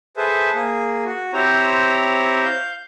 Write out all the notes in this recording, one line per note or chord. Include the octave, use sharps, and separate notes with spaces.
G#4 A4 B4 C5 E5
A#3 G#4
F#4
C4 E4 G4 C5 C#5 A#5
F5 G6